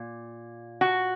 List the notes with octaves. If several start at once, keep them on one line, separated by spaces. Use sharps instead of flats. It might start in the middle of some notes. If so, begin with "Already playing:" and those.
Already playing: A#2
F#4